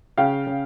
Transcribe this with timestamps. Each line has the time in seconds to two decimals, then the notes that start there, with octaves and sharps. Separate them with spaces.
0.18 C#3 F5 G5
0.47 C#3